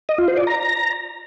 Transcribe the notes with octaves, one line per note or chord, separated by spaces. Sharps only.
D#5
F4
C5
D5
A#5